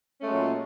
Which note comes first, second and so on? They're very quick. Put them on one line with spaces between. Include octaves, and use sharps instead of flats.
C#4 A3 G#3 F#3 A#2